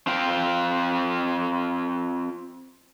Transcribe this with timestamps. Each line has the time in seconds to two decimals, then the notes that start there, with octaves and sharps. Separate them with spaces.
0.07 C4 F4 F5 G5